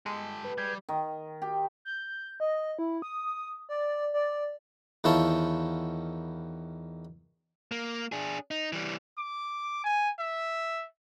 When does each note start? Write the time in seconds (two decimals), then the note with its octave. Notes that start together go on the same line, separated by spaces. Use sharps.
0.06 G#3 G4 A4
0.45 B4
0.58 G3 G#4 G5
0.89 D#3
1.42 G4
1.85 G6
2.40 D#5
2.79 E4
3.02 D#6
3.69 D5
4.14 D5
5.04 E2 D#3 E4 F4 C#5 A5
7.72 A#3
8.12 D4 G#4
8.51 D#4
8.73 E3 G3
9.17 D6
9.84 G#5
10.19 E5